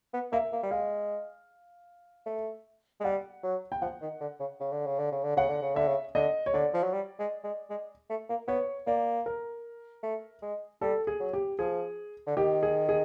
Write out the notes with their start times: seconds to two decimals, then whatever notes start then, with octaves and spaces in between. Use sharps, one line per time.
0.14 B3
0.32 A#3 E5
0.53 A#3
0.63 G3
0.71 G#3 F5
2.26 A3
3.01 G#3
3.05 G3 F#5
3.44 F#3
3.72 G5
3.82 F3 F#5
4.02 D#3
4.21 D3
4.40 C#3
4.60 C#3
4.72 D3
4.86 C#3
4.99 D3
5.12 C#3
5.24 D3
5.37 C#3 F#5
5.50 D3
5.62 C#3
5.75 D3 E5
5.88 C#3
6.15 D3 D#5
6.46 C#5
6.54 D3 D5
6.74 F3
6.83 F#3
6.93 G3
7.19 G#3
7.44 G#3
7.70 G#3
8.10 A3
8.29 A#3
8.48 B3 C#5
8.87 A#3 D5
9.26 A#4
10.03 A3
10.42 G#3
10.81 G3 A4
11.07 G#4
11.20 F#3
11.33 G4
11.59 F3 G#4
12.27 D3
12.37 D#3 G4
12.63 G#4
12.89 G#4